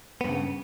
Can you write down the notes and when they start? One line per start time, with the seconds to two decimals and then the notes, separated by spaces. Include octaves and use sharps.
0.21 B3
0.25 G2
0.28 C#3